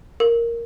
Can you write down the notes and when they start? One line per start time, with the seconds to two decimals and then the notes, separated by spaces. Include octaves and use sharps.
0.20 A#4